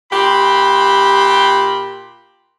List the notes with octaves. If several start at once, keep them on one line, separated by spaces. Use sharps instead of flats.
A#2 G4 B5 C6